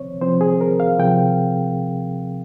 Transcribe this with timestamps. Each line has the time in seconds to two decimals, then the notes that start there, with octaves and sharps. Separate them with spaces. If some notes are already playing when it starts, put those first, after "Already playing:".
Already playing: C3 F3 C4 C5 C#5
0.21 C3 F3 C4 C5
0.41 G#4
0.61 A#4
0.80 F5
0.98 C3 F3 C4 G5